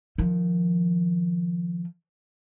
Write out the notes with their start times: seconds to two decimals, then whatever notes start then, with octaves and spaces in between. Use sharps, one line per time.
0.18 D#3 F3